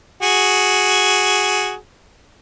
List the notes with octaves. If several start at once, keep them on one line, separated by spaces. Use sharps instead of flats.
F#4 G#4